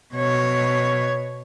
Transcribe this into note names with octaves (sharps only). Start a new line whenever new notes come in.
B2 C#5